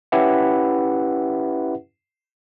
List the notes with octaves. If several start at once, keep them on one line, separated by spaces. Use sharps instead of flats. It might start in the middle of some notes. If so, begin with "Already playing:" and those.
C#4 E4 G4 B4 E5 F#5